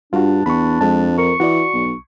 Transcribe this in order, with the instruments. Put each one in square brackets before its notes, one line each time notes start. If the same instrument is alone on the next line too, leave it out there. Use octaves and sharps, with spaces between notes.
[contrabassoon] G2 [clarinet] D4 [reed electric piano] F4 F#4
[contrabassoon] E2 [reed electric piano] B5 C#6
[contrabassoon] F2 [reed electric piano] G#3 A5
[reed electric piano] A#4 [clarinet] C#6
[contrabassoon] E3 [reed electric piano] F#4 D5
[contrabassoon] B1